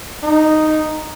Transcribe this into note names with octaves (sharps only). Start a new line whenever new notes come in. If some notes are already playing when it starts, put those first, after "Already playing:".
D#4